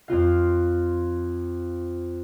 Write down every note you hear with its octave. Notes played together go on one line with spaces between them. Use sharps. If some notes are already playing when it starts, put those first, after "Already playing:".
F2 C4 F4 F5